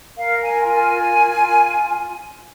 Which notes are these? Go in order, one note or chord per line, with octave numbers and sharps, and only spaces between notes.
A#4 F5
G#5
F4
G#5
A#4
F4